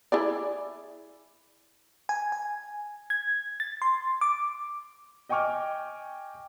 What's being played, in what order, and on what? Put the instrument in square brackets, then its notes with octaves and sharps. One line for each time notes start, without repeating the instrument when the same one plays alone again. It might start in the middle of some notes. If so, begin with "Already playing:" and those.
[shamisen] E4 G#4 D5
[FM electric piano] G#5
G#5
G#6
A6
C6
D6
[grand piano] D#5 G5 G#5 C#6 D6 F6